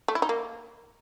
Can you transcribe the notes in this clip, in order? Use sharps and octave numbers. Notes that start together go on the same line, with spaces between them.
A3
E4
D#4
A#3